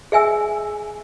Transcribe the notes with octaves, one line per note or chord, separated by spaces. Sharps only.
G#4 E5 G#5 E6